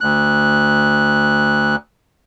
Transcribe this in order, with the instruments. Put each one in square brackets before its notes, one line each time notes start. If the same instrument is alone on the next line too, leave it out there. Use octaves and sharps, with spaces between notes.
[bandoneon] D2 F#6